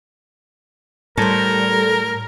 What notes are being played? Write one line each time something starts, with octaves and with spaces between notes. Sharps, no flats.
A2 G3 A4 A#4 C5